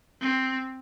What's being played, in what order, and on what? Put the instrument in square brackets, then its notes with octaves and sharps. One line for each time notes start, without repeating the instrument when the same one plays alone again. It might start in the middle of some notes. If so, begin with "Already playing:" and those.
[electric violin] C4